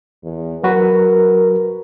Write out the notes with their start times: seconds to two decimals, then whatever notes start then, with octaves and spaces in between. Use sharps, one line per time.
0.23 E2
0.63 F#3 F#4 A#4 B4